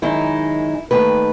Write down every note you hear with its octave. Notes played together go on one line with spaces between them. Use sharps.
F#2 D#3 G#3 D#4 E4
D#2 D#3 A3 B4